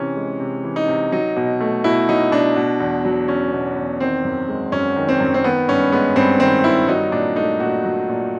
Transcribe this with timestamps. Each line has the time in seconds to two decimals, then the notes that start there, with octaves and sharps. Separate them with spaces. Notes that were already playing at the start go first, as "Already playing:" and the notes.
Already playing: C3 E3 C#4
0.16 G#3
0.40 C3
0.64 E3
0.76 D#4
0.88 C3
1.12 F#3 D#4
1.37 B2
1.60 A3
1.84 B2 E4
2.08 F#3 D#4
2.32 B2 D4
2.56 B2
2.80 E2
3.05 F#3
3.28 E2 C#4
3.52 B2
3.76 E2
4.00 D#3 C4
4.24 F#2
4.49 G#3
4.72 F#2 C#4
4.96 D#3
5.09 C4
5.20 F#2
5.34 C4
5.44 D#3 B3
5.68 G2 C#4
5.92 G#3 B3
6.16 G2 C4
6.40 D#3 C4
6.64 G2 E4
6.88 F#3 D#4
7.12 A#2 D4
7.36 A3 D#4
7.60 A#2 F#4
7.84 F#3
8.08 A#2